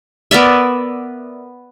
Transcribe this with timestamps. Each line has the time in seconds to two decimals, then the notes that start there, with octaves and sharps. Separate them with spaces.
0.31 B3 A#4 D5 E5